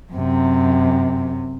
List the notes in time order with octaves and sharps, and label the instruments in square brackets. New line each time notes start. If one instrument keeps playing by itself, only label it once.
[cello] F#2 C3